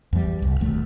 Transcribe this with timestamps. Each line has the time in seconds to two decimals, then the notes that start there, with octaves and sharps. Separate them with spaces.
0.13 E2 G3
0.42 C2
0.60 E1 D#2 A3